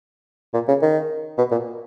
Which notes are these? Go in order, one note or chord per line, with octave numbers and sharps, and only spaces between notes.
A#2
C#3
D#3
B2
A#2